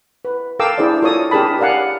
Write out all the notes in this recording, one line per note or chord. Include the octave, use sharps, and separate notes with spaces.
B4
A4 A#4 F5 G5 D6 E6
D4 E4 G#4 C5 D5
F4 A4 A#4 C#5 D5 D#6
D4 G4 G#4 A#4 A5 B5
A#4 C#5 D5 F5 F#5 G#5